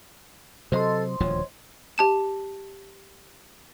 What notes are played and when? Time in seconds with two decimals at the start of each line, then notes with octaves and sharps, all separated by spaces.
0.72 C3 F#3 A4 C5 D#5 C6
1.20 D#1 D2 F3 C#5
1.98 G4 A5 E7